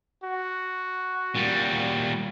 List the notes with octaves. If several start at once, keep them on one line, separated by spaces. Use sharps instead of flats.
F#4
A#2 G3